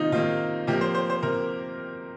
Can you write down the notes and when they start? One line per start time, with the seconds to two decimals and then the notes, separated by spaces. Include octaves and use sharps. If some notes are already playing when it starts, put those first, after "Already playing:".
Already playing: C3 D#3 A#3 D#4 F4
0.12 C3 D#3 A#3 F4
0.67 C3 F3 A#3 G4
0.81 C5
0.95 C5
1.10 C5
1.23 C3 A#4